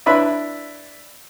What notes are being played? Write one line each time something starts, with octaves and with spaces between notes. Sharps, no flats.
D4 E4 B4 E5 B5